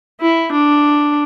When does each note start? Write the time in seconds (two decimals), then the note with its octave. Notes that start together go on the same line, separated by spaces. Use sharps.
0.21 E4
0.52 D4